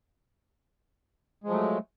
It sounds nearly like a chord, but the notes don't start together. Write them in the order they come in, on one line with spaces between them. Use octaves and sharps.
G#3 F3 F#3 A3